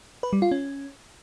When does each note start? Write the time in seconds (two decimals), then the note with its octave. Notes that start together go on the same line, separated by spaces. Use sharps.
0.23 B4
0.33 G3
0.42 F4
0.51 C#4